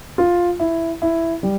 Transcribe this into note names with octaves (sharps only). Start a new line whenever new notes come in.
F4
E4
E4
G3